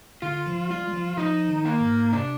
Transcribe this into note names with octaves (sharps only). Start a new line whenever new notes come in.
D3 F4
F3
G3 F4
G3
F3
F3 D#4
D#3
A#3
G#2
C3 D4